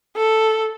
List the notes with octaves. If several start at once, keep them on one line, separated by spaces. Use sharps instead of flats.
A4